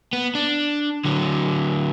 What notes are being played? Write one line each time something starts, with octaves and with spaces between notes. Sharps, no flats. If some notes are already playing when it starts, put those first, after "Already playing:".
B3
D4
D3 F#3